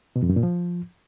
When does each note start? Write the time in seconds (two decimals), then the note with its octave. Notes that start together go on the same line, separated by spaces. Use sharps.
0.16 B2
0.23 F2
0.29 F#2
0.36 A#2
0.43 F3